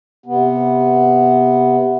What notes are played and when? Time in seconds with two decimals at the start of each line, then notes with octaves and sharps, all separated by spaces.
0.26 C3 B3